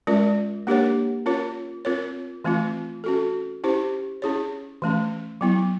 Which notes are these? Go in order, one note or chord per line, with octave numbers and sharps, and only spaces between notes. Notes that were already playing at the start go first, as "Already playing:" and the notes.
G#3 C#4 F4 A#4 D5
A#3 D4 G4 A#4 C#5
C#4 F4 A#4 C#5
C4 F4 A#4 C#5
E3 A3 C4 F4
C#4 F#4 A4
C#4 E4 G4 C5
C#4 E4 G#4 C#5
E3 A3 C#4
F#3 B3 E4